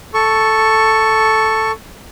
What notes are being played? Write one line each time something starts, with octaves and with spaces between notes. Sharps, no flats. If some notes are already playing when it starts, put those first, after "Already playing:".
A4 C#6